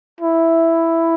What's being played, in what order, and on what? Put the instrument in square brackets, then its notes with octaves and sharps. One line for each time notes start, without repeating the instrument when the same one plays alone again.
[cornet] E4